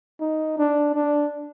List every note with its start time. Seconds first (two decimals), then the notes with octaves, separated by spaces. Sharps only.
0.20 D#4
0.58 D4
0.95 D4